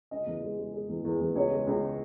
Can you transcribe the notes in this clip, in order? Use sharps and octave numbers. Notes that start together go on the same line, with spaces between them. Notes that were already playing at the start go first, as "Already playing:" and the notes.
C#3 D#5
E2
G#3
G#3
G#3
E2
E2
E2
C#2 C#5
G#3
C#2